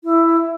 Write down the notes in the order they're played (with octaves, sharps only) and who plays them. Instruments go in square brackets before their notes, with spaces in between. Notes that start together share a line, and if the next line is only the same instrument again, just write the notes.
[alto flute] E4